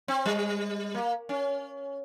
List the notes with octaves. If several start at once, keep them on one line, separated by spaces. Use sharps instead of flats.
C4
G3
A#3
C#4